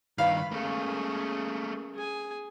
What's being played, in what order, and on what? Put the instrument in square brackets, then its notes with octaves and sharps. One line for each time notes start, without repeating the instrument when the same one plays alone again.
[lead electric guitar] G2 D#3 [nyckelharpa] B4 B5 [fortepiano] F5
[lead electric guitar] A3 A#3 [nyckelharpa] C#4 G#4
[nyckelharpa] G#4 G#5